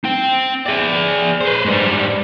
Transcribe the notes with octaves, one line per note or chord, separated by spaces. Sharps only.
C4 G5
G#4 D5
B4 C5
G#2 G3